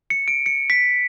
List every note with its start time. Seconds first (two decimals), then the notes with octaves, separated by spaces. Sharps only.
0.10 C#7
0.28 D7
0.46 C#7
0.70 B6